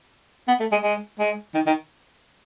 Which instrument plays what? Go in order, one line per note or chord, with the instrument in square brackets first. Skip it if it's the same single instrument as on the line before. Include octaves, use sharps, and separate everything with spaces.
[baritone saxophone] B3
A3
G#3
G#3
G#3
D#3
D#3